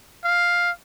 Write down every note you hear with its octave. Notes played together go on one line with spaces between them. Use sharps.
F5